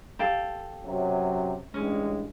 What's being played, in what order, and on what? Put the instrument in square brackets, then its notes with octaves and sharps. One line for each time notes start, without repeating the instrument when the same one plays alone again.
[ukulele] G4 A4 F5
[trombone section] F#2 C3 F#3
[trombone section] A1 G2 G#3 [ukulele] C#4